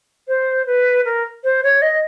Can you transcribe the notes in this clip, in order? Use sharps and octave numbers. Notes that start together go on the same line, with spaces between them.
C5
B4
A#4
C5
C#5
D#5